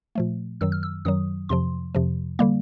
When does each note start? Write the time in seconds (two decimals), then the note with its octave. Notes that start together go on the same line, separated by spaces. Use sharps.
0.15 A#2 F3 A3
0.61 F#2 D#3 F#3 E6
0.72 F6
0.83 E6
1.05 F#2 D#3 F#3 D#6
1.49 F2 C3 F3 C6
1.95 F2 C3 F3
2.39 D3 G3 A#3